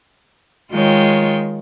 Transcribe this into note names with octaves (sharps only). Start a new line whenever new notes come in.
D#3 G#3 F4 C#5 G5